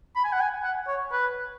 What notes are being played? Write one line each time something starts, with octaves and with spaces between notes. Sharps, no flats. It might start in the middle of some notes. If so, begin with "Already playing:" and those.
B5
G#5
F#5
G#5
F#5
C#5
B4